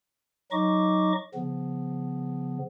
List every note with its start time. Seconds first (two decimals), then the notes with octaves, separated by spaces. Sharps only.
0.52 F#3 D#4 D#5 C#6 D6
1.34 C#3 F3 B3